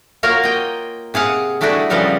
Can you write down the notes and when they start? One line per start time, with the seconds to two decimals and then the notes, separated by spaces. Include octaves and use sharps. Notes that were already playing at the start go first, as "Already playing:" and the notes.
0.23 A#3 F4 F#4 A#4 C#5
0.43 D#5 G5
1.14 C3 G#4 F5 F#5
1.61 G3 A3 D4 E4 F#4 G#4
1.90 C#3 F3 G3 B3 A4 A#4